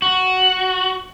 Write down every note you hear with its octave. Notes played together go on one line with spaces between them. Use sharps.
F#4